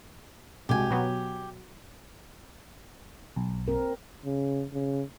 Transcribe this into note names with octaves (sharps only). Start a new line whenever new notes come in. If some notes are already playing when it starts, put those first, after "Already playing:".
C2 G#3 F#4 G4 G#5
B2 F#3 B3 F#4
B1
C4 A#4
C#3
C#3